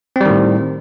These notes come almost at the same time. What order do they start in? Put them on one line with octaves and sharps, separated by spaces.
C4 G3 D#3 A2